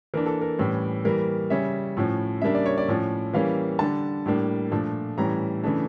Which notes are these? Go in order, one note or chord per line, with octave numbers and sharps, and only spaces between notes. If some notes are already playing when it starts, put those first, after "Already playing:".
E3 A#3 D4 A#4
A4
A#4
A2 E3 G3 C#4
E3 G3 A#3 A#4
C#3 G3 C#4 E5
A2 F3 C#4
C#3 G3 A#3 D4 E5
D5
C#5
D5
A2 F3 C#4
E3 G3 A#3 C#4 F5
D3 G3 D4 A5
A2 G3 A#3 D4
A#2 F3 A3 D4
A2 E3 G3 C#4 A#5
C#3 E3 A3 D4